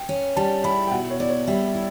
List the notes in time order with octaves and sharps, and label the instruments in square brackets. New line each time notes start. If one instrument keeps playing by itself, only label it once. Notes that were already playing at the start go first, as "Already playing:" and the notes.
Already playing: [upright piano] G5
[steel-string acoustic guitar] C#4
[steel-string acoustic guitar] G3 [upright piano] A5
[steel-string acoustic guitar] E4 [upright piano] B5
[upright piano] G5
[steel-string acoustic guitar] B2 [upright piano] F#5
[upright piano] C#5
[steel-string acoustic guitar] E4 [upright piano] D5
[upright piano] C#5
[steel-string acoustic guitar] G3 [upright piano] E5
[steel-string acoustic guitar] E4